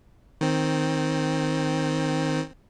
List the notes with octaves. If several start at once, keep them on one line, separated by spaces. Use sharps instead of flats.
D#3 C4